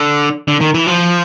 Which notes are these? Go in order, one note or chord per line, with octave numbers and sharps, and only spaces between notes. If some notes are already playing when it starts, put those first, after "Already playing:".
Already playing: D3
D3
D#3
E3
F3